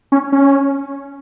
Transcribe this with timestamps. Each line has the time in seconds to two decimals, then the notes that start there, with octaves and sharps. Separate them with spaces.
0.12 C#4
0.32 C#4